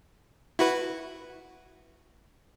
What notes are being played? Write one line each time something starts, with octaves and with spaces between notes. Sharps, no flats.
E4 F#4 B4